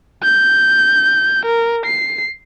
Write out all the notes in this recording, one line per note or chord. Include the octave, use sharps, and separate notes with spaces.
G6
A#4
C7